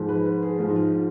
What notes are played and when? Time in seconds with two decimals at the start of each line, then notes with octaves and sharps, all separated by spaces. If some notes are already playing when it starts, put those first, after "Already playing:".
Already playing: G#2 F3 G#3
0.09 B4
0.26 B4
0.43 G#4
0.59 G#2 F3 G#3 F4
0.69 D#4
0.76 F4
0.93 F4